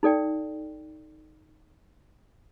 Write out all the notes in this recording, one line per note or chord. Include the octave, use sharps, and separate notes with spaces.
D#4 A4 D5 G5